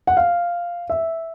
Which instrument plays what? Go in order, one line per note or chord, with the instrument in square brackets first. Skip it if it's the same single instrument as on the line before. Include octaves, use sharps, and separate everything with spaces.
[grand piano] F#5
F5
E5